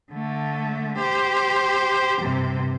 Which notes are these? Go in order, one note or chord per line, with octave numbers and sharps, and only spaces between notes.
D3 A3
G4 C5
G2 C3